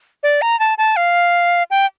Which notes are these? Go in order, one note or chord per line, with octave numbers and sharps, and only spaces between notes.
D5
A#5
A5
A5
F5
G5